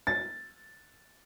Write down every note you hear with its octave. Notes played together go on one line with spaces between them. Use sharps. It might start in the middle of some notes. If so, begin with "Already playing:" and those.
A6